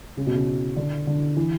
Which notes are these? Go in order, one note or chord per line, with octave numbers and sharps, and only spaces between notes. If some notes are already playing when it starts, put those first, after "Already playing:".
C#3
B2
C#3
D3
D3
E3